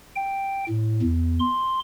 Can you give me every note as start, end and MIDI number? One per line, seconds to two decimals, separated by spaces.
0.16 0.65 79
0.69 1.01 45
1.02 1.39 40
1.40 1.80 84